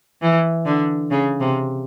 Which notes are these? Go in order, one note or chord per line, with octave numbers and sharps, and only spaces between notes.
E3
D3
C#3
C3